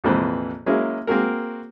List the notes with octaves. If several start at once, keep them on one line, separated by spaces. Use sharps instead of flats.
A#1 F2 C3 E3 B4 C5
F#3 G#3 A#3 C#4 E4
A#3 C4 F#4 G#4 A#4